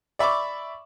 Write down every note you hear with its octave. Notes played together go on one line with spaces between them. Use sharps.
D5 E5 B5 C#6 D6